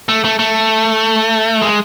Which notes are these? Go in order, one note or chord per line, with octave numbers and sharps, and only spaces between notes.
A3
A3
A3
G#3